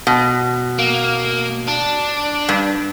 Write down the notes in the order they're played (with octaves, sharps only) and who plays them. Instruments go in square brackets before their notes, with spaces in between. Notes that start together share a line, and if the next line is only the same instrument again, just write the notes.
[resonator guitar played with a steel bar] B2
[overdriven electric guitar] A#3
D4
[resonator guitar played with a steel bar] G2